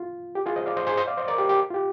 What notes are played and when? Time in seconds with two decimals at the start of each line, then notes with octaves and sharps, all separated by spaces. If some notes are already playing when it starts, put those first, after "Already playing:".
Already playing: F4
0.35 G4
0.46 F4 G#4
0.56 C5 D#5
0.66 D5 F5
0.77 C5 D#5
0.87 G#4 C5
0.97 C5 D#5
1.08 D5 F5
1.17 C5 D#5
1.28 A#4 D5
1.38 G4
1.49 G4
1.70 F4
1.74 G4